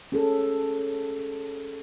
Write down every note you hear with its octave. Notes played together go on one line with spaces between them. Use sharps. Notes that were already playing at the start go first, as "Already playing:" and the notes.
C#4 G#4 A4